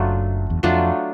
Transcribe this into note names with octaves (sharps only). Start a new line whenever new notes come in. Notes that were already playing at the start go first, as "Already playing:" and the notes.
Already playing: F#1 F#2 F#3 A3 D4 F4
E2
F2 F#3 A3 D4 F4